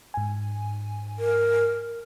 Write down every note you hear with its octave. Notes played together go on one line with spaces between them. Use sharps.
G#2 G#5
A#4